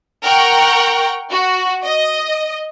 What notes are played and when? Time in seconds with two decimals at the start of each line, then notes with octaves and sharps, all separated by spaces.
0.24 A#4 F#5 G5 C#6
1.31 F#4
1.84 D#5